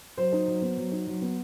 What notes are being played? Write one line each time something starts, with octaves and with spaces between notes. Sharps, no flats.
F#3 C5
D#4
F#3
B3
F#3
D#4
F#3
B3